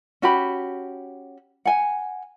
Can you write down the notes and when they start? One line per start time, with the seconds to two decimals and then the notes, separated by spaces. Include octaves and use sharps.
0.22 C#4 F#4 G4 B5
1.66 F#5 G#5